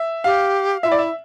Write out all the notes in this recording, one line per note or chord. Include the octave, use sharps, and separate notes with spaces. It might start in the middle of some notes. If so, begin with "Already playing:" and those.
Already playing: E5
G4 F5
F4 E5
E4 D5
E5